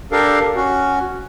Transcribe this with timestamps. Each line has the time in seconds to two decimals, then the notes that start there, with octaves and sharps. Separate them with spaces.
0.12 D4 G4 A4 A#4 F5
0.56 C#4 F#4